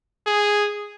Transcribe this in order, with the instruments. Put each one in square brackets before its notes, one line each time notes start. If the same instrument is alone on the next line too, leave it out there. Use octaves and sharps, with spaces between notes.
[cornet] G#4